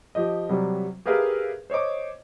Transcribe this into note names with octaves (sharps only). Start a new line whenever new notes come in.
F3 G4 D#5
C3 F#3 G3
G4 G#4 A#4 B4 E5 F5
C5 C#5 D#5 D6